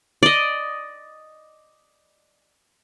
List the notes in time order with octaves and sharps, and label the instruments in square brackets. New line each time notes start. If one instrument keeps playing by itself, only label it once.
[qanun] D5 D#5